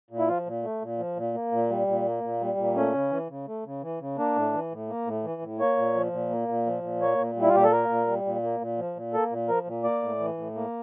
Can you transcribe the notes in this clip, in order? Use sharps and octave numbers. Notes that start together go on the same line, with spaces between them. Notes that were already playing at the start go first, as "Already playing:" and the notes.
A#2
E4
F3 F4
A#2
A3
A#2
F3
A#2
A#3
A#2
G3
A#2
A#3
A#2
G3
A#2
A3 C#4
C#3
E3
C#3
A3
C#3
E3
C#3
A#3 D4
A2
E3
A2
A#3
A2
E3
A2
A#3 C#5
A#2
F3
A#2
A#3
A#2
F3
A#2
A#3 C#5
A#2
G3
E4
F4
A#2 G4
A4
A#3 A#4
A#2
G3
A#2
A#3
A#2
F3
A#2
A#3 A4
A#2
F3 A#4
A#2
A#3 D5
A2
E3
A2
A#3